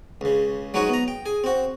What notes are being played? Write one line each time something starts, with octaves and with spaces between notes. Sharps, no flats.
C#2 C#3
F#3 G#3 D#4 F#4 B4 C#5
B3 A#5
G5
G#4
C4 F#4